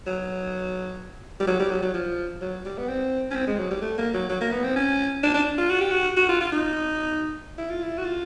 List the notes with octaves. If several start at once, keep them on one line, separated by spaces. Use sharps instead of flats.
F#3
G3
F#3
G3
F#3
F#3
F3
F#3
G3
B3
C4
C#4
C4
G#3
F#3
G3
A3
A#3
F#3
F#3
A#3
B3
C4
C#4
D4
D4
F4
F#4
G4
F#4
F#4
F4
F4
D#4
E4
F4
E4
F#4
F4